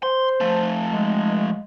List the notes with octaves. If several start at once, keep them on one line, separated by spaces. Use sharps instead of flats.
C5 C6
F3 A3
G#3